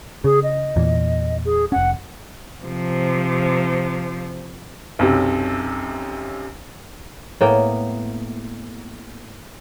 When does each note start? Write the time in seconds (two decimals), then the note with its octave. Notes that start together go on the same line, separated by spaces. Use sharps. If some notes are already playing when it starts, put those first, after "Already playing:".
0.24 C#3 G#4
0.43 D#5
0.76 E2 A#2 E3
1.45 G#4
1.72 F1 C#4 F#5
2.64 C3 F3
4.99 B1 F#2 C3
7.41 A2 A#3 B3 G5